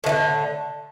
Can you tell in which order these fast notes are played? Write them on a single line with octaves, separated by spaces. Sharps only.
A2 E3 D3